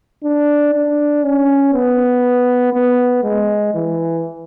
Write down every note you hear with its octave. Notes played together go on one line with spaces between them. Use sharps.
D4
D4
C#4
B3
B3
G#3
E3